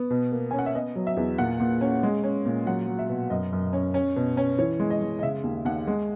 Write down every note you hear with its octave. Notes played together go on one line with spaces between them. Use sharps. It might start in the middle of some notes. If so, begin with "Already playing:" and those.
Already playing: B3
B2
A#3
C#4 G#5
F#5
E5
B3 D#5
F#3
E5
E2
A#2 F#5
A#2
C#4
G#3
C#4
A#2
F#3 F#5
F#3
E5
B2
F#2 D#5
F#2
C#4
C#4
B2
C#4
E3 C#5
G#3
D#5
G#3
D#5
C#3 E5
D#2
D#2 F#5
G#3